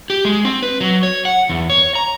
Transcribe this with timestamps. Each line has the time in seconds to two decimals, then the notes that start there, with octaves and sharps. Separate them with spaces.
0.10 G4
0.25 G#3
0.45 C4
0.63 B4
0.80 F#3
1.03 C#5
1.25 F#5
1.49 E2
1.70 C#5
1.95 A#5